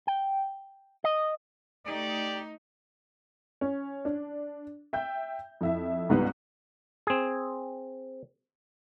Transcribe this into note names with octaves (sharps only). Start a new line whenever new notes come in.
G5
D#5
A3 D#4 G4 D5
C#4
D4
E5 G5 G6
F2 E4 E5
C#2 G#2 G3 B3
C4 G#4